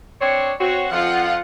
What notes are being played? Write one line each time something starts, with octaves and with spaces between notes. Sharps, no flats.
C4 D4 C#5
C4 F#4 C#5
F2 F3 F4 F#5